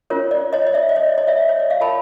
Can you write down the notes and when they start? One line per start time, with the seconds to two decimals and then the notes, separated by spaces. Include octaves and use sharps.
0.10 C#4 F4 A#4 C#5
0.31 D5
0.53 C#5 D#5
0.67 D#5
0.74 D5 E5
0.89 D5
0.96 C#5 D#5
1.06 D5
1.18 C#5 D#5
1.27 D5 E5
1.40 D5
1.49 C#5
1.60 D5
1.70 D#5 F5
1.81 F4 A#4 C#5 A5 B5